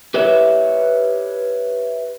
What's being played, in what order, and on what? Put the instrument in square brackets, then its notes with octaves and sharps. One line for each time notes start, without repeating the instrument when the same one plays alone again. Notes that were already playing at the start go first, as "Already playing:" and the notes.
[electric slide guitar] G4 B4 C#5 E5